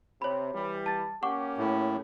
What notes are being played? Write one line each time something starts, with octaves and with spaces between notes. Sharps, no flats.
C3 C#5 B5
E3 G3
A5 A6
A#3 C#4 G4 F#5 C#6 D6
A2